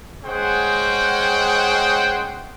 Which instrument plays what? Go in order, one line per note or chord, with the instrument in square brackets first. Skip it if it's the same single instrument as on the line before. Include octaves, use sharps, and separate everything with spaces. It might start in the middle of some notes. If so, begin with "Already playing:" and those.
[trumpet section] G#3 C#4 G#4 C5 F#5 G5